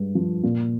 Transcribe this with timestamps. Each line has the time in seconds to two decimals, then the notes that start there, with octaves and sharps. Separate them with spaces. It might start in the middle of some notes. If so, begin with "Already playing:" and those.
Already playing: G2 G#3
0.15 F3
0.43 A#2